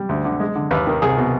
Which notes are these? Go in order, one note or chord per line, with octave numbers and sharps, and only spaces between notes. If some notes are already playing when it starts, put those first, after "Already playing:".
Already playing: G3
D2
D3
G#3
D3
D#2 B4
D#3
C2 G#4
B2